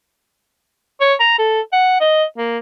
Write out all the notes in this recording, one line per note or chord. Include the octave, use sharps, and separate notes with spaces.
C#5
A#5
A4
F#5
D#5
A#3